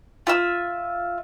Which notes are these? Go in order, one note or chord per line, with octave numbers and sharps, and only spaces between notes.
F4 E5 E6